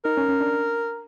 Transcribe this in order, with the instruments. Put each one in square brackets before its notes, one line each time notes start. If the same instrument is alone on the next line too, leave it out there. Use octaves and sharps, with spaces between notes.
[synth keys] D#4 [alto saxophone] A#4
[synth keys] C#4
C#4
D4